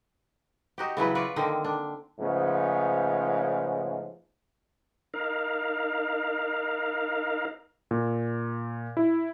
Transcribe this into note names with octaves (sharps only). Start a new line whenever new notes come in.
D#4 F#4 G4
C#3 E3 F#3 B4
F4 B4 C#5 D5
D3 D#3 A#3 C4
D4
G#2 C#3 F3 A3 B3 C#4
D#4 A#4 F5
A#2
E4